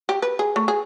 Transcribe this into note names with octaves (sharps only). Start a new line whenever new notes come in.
G4
B4
G#4
A3
G#4